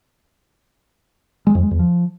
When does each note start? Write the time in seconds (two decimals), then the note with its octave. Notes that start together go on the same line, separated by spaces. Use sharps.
1.47 G#3
1.55 F2
1.63 G#3
1.71 E2
1.79 F3